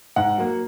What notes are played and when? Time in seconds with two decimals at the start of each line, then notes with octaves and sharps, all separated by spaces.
0.16 G#2 F#5
0.38 F#3 A#3